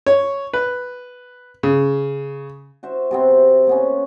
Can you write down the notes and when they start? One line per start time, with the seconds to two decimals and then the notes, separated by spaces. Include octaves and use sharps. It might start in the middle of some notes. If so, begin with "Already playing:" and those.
0.07 C#5
0.53 B4
1.63 C#3
2.83 F#4 C5 E5
3.11 C3 B3 C4
3.31 C4
3.67 A#3 B3 C#4